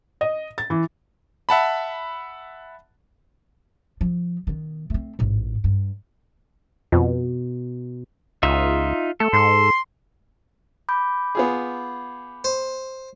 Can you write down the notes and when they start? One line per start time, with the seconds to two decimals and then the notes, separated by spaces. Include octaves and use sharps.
0.21 D#5
0.58 A6
0.70 E3
1.49 E5 F#5 A5 B5
4.01 F3
4.47 D#3 B3
4.90 A3 C4
5.19 A1 G#2
5.64 G2
6.92 F2 B2
8.43 C#2 D#4 F4 E5
9.20 A3 A4
9.33 G#2 C6
10.89 B5 D6 G6
11.35 B3 F4 G#4
12.44 C5